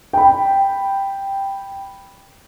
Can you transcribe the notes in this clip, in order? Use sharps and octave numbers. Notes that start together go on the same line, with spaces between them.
G5 B5